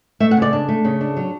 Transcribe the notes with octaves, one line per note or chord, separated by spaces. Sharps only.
A3 E5
F#5
C#3 D5
D4
A3
C#3
D4
F#3